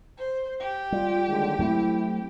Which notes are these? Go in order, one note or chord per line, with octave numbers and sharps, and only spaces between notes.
C5
G4
G3 F4
D#2 D3 G#3
F#3 A3 C4 E4